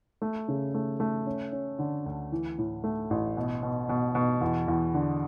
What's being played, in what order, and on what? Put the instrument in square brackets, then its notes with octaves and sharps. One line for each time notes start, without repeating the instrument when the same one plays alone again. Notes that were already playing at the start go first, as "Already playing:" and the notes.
[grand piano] A3
C#3
A3
A3
C#4
C#4
D3
D2
E3
A2
A3
A1
B2
B2
B2
B2
E2
E2
D3